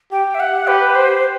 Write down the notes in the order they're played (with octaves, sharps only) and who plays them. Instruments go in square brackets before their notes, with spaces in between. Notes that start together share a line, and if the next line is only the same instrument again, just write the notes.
[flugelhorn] G4 [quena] G5
[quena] E5
F#5
[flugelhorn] G4 [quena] B4
[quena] C5